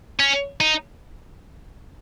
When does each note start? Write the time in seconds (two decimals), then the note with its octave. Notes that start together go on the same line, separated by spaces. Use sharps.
0.20 C#4
0.60 D#4